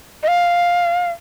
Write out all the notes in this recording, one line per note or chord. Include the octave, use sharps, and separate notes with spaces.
D#5
F5